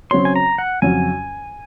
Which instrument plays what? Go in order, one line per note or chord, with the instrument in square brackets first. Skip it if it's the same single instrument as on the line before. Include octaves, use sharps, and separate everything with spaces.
[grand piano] C#3 F#3 C4 F#4 C#5 [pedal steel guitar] C6
[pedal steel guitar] G#5
A#5
F#5
[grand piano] F2 C#3 F#3 C#4 F#4 [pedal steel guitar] G#5